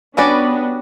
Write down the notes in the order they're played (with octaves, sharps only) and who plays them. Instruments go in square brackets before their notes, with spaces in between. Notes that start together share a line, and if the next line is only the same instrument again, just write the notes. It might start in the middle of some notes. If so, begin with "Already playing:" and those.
[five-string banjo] G3 C#4 F#4 B4 D5 [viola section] B3 D4